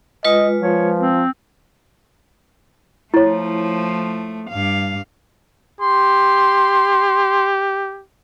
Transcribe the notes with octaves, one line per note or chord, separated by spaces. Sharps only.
G#3 F4 B4 D#5
F3 C#5
C4
F3 A3 E4 C#5
G2 F5
G4 C6